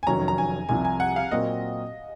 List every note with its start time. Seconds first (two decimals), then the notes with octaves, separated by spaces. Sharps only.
0.03 G#5
0.07 F1 F2 D#3 F#3 C#4 A#5
0.28 A#5
0.38 G#5
0.69 C2 C3 F3 G#5
0.85 G#5
1.00 F#5
1.16 F5
1.31 A#2 F#3 C4 F#4 A#4 D#5